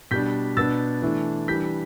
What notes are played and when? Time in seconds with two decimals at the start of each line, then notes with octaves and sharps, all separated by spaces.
0.11 B2 G3 D4 G6 B6
0.57 B2 B3 D4 E6 A6
1.02 E3 A3 D4
1.48 E3 G3 D4 G6 B6